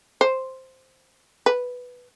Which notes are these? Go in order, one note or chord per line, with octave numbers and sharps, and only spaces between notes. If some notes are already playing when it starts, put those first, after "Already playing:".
C5
B4